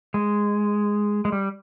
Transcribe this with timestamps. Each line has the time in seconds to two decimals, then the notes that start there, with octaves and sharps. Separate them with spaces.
0.14 G#3
1.25 G#3
1.32 G3